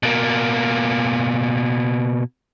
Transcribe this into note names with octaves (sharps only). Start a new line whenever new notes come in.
B2 A#3